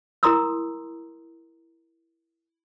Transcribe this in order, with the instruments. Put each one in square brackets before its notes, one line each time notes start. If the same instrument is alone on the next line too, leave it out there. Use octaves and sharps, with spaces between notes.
[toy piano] E4 A#4 A#5 C6 D#6 E6